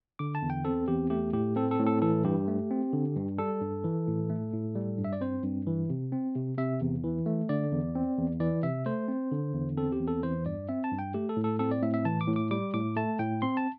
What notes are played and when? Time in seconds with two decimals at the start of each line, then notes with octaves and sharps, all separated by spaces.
0.19 D3 D6
0.35 A5
0.42 E2
0.50 G5
0.65 C4 A4
0.88 E2 G4
1.10 A3 G4
1.33 A2 G4
1.56 C4 A4
1.71 A4
1.79 A2
1.86 A4
2.02 E3 A4
2.24 G2 G4
2.48 A3
2.71 C4
2.93 D3
3.16 G2
3.38 G3 A4
3.61 G2
3.84 E3
4.07 A2
4.30 A3
4.53 A2
4.75 G3
4.98 G2
5.04 E5
5.13 D5
5.21 C4 C5
5.44 G2
5.67 E3
5.90 C3
6.12 C4
6.35 C3
6.58 C3 E5
6.81 E2
7.04 E3
7.26 A3
7.49 D3 D5
7.72 E2
7.95 C4
8.18 E2
8.40 E3 D5
8.63 C3 E5
8.86 A3 C5
9.08 C4
9.32 D3
9.54 E2
9.77 C4 A4
9.92 G4
10.00 E2
10.08 A4
10.23 E3 C5
10.46 G2 D5
10.69 C4 E5
10.84 A5
10.92 G2
10.99 G5
11.14 A3 G4
11.29 A4
11.37 A2
11.44 A4
11.59 C4 A4
11.71 D5
11.82 A2 E5
11.94 E5
12.05 E3 A5
12.21 D6
12.28 A2
12.36 D6
12.51 G3 D6
12.74 A2 D6
12.96 A3 A5
13.19 A2 G5
13.42 C4 C6
13.57 A5